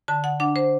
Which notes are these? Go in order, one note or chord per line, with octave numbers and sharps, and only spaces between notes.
D3 A5
F#5
D4 F#5
C5